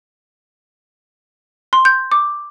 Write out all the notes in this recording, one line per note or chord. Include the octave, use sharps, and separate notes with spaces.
C6
G6
D6